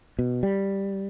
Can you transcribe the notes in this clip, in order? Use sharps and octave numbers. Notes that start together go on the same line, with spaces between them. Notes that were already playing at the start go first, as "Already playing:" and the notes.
B2
G3